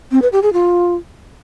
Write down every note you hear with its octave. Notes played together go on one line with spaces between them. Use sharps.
C4
B4
G4
G#4
F4